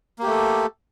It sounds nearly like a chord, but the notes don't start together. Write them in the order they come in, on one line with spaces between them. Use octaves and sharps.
A#3 G4 A3 A4